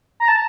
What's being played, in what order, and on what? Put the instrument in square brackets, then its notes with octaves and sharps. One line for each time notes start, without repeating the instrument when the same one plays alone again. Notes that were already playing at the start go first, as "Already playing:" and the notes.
[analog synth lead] A#5
A5